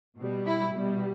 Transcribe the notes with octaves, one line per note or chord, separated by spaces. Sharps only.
B2 G3
E4
B2 G3